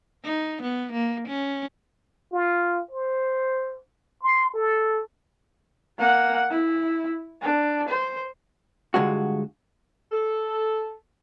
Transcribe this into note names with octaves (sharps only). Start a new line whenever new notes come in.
D#4
B3
A#3
C#4
F4
C5
C6
A4
A#3 F#5
E4
D4
C5
G2 D3 G#3 F4 F#4
A4